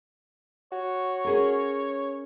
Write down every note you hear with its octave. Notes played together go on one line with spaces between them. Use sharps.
F#4 C#5
C#4 G#4 A#4